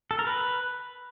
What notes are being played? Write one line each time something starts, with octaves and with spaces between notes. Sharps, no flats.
A4
A#4
B4